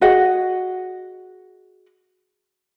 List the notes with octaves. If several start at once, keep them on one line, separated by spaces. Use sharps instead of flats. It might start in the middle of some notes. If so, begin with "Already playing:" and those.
F#4 G#4 D#5 F#5